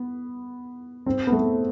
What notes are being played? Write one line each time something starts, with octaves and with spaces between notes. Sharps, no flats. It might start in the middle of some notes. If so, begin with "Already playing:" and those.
Already playing: B3
C4
B3
A3